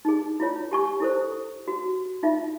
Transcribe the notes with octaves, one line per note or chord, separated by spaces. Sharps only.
D#4 G#4
E4 F4 C#5
G4 G#5 C#6
E4 A4 C5
F#4
D#4 F4 E5